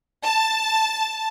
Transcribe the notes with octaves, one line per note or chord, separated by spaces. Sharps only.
A5